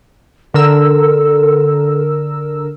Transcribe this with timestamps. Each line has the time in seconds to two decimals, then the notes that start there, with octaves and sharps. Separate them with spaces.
0.54 D3 A4 A#4 E6